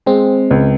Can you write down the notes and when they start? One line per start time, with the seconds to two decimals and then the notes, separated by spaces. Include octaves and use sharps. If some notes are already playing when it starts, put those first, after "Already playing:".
0.06 G#3 C4
0.51 C#2